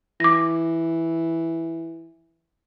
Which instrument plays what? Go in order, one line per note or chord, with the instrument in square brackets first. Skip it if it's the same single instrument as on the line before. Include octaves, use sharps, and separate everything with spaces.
[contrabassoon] E3 [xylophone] D6 A#6